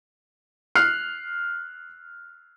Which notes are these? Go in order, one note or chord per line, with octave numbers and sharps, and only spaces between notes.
F6 F#6 C7